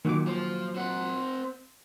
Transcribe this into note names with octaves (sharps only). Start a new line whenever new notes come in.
A#2 D#3 F#3 D6
F3
C4 F#5